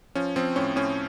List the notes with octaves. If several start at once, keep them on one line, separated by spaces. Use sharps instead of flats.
F3 C#4
F3 C4
A2 C#4
A2 C#4